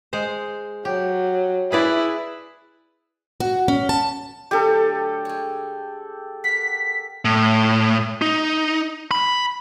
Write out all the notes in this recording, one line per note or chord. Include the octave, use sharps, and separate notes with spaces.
G#3 C5
F#3 G4
E4 G#4 B4 D5
F#4
C#4
A5
D3 F#3 A3 G4 A4
G#3 C#5
A#4 F#5 B6
A2
D#4
B5